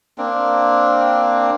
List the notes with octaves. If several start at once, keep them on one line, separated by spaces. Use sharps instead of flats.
A#3 C4 D4